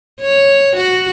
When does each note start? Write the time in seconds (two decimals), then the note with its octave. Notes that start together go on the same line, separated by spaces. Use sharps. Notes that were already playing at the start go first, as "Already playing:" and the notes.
0.21 C#5
0.77 F#4